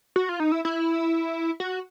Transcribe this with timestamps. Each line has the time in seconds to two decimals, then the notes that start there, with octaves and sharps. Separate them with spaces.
0.16 F#4
0.29 F4
0.40 D#4
0.52 E4
0.65 E4
1.60 F#4